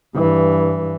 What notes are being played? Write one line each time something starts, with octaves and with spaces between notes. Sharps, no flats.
G2 E3